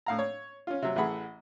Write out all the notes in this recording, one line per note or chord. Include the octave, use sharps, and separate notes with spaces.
A2 F5 A#5
C#5
C#4 F4
C3 F#3
A1 E3 A3 G#4 F#5 B5